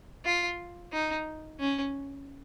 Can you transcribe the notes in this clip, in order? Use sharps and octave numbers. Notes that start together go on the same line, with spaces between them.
F4
D#4
C#4